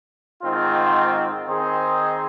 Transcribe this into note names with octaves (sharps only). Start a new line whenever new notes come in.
G#2 D#3 C4 F4
D#3 C4 D#4 G#4 C5